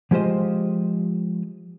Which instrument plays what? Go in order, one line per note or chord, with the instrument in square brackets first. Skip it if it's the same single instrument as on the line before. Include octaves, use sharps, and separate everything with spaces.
[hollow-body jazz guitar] F3 G#3 F4 G4 C5 D#5